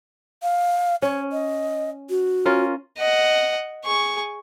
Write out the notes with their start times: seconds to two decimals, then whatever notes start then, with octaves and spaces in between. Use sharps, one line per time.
0.43 F5
1.02 C#4 C#5
1.32 D#5
2.10 F#4
2.45 C#4 F4 A#4
2.98 D#5 F#5
3.85 G#4 C#6